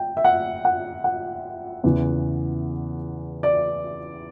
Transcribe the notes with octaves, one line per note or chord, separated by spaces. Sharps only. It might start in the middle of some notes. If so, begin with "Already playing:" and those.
Already playing: G5
E5
F#5
F#5
F#5
E2 C#3 E3
D5